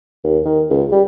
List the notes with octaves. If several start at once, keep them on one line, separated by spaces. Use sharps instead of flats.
D#2
D#3
C#2
G3